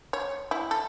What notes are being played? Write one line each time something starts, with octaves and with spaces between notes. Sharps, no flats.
C#5
E4
A4